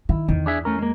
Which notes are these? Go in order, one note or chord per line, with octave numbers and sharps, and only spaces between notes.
D#3 E4
E2 D#3
D4 G#4 E5
A3 C#4 A#4
G#3 A#3